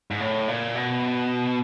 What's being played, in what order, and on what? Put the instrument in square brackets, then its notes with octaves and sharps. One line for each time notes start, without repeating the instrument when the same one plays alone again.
[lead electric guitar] G#2
A2
A#2
B2